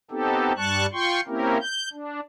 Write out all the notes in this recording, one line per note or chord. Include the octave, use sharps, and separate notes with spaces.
B3 C4 D#4 G4 A4
G2 G3 A5 C#6 F#6
F4 G5 C6 C#6
A#3 C4 C#4 E4 G4 A#4
G6
D4